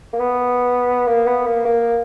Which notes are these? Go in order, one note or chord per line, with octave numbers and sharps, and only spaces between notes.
A#3
B3
A#3
B3
A#3
A#3